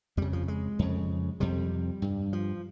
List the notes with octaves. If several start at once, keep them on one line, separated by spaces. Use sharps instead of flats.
F2 C#3 G3
F3
G#3
F2 C#3
F2 C3 G3
G2
F3